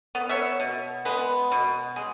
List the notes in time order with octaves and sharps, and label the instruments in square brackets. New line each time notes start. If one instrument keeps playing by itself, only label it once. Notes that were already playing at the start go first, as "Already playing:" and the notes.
[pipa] B3
C#5 E5
B2
G#3 B3
B2
G#3